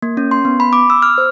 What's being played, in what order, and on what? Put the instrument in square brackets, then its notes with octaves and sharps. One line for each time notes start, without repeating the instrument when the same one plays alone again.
[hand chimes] A#3
C#4
C6
B3
B5
D6
E6
F6
C5